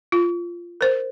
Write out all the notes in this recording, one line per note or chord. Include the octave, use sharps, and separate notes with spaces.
F4
A#4 C5